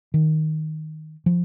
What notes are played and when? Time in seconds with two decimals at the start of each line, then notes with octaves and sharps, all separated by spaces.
0.14 D#3
1.26 F3